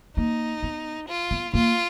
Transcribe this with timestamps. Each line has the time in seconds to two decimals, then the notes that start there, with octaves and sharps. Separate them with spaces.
0.17 A#3 D#4
0.63 B3
1.08 F4
1.31 B3
1.54 A#3 F4